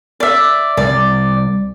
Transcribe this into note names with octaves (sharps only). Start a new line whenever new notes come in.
D5 E5
C2 D5